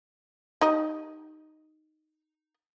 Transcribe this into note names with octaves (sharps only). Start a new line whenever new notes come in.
D#4 G4 D#5